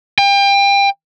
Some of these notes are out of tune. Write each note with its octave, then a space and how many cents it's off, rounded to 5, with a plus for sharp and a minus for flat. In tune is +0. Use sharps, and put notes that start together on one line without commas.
G5 +30